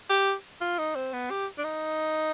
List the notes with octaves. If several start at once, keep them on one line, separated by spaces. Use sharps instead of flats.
G4
F4
D#4
C4
B3
G4
D4
D#4